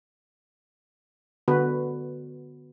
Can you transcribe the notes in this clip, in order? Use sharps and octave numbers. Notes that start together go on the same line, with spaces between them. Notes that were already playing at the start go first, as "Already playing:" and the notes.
D3 B3 F#4 B4